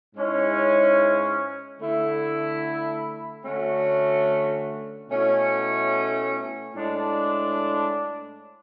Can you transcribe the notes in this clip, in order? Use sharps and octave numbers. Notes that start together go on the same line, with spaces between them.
G#2 G#3 C#4 E4
D3 A3 E4
D3 A3 C#4 F#4
B2 A3 C#4 E4
A2 G#3 D4